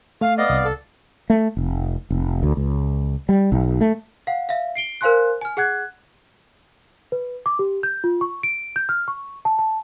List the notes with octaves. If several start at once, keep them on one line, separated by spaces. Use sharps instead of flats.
A3 F5
B3 D5 D#5 F5
C2
A4
A3
F1
F1
D2
C#2
G3
B1
A3
F5 F#5
E5 F5
C7 D7 G7
A#4 C5 F5 G#5 C6 F#6
G#5 F6
G#4 F#5 F#6 G#6
B4
D6
G4
G6
F4
C#6
D7
G6
F6
C#6
A5
A5